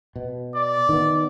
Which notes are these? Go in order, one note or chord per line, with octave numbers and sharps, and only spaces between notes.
B2
D5
D#3 B3